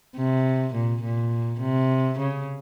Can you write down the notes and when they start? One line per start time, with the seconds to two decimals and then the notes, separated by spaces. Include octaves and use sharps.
0.16 C3
0.74 A#2
1.03 A#2
1.61 C3
2.19 C#3